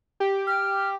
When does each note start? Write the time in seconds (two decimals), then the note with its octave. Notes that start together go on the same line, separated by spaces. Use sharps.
0.20 G4
0.47 F6